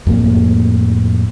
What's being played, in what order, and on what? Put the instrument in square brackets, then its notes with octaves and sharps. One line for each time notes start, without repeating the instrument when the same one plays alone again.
[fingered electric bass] F2 A2 A#3